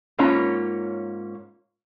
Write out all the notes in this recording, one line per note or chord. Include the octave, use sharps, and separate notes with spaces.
G#2 A#3 C#4 F4 C#5 A#5